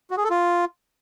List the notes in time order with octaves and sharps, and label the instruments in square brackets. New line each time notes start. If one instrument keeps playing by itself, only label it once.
[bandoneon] F#4
G#4
A4
F4